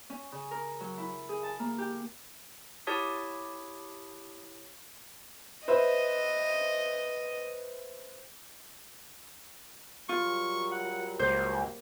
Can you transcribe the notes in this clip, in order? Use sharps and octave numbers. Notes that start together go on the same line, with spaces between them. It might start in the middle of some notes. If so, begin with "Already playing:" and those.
C#4
C#3
A#4
F#3
E4
G#4
A5
A#3
G4
E4 G4 C#5 A5 D#6 B6
B4 C5 D#5 E5
F#3 G3 F4 A#4 C#6
F#5
C#2 A#3 C5